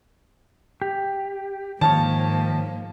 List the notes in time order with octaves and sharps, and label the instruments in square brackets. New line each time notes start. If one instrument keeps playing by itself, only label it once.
[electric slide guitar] G4
[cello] G#2 A#3 [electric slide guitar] D#3 F3 C#5 [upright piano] A5